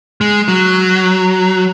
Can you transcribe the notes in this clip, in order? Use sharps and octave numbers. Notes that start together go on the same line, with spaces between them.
G#3
F#3